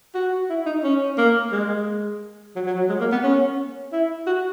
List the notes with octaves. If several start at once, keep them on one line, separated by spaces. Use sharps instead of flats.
F#4
E4
D#4
C#4
A#3
G#3
F#3
F#3
F#3
G#3
A#3
B3
C#4
E4
F#4